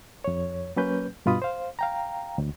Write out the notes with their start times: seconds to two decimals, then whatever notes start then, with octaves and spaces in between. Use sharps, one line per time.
0.24 F2 C#5
0.76 F#3 A#3 C#4 B4 G6
1.26 G2 B2 F4 B5 D#6
1.42 C5 F5
1.79 F5 G5 A#5
2.38 D2